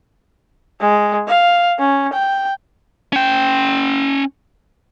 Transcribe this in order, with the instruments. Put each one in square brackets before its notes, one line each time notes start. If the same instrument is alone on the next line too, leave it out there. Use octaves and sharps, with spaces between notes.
[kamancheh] G#3
F5
C#4
G5
[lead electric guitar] C#4 G5